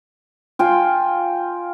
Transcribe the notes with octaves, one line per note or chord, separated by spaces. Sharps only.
F4 G5 G#5